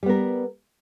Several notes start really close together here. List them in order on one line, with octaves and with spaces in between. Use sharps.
G3 B3 A#4